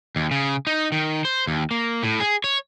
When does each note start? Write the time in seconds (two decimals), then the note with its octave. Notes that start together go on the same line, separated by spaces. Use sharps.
0.16 D#2
0.31 C#3
0.67 D#4
0.92 D#3
1.25 C5
1.47 D#2
1.71 A#3
2.03 A2
2.20 G#4
2.44 C#5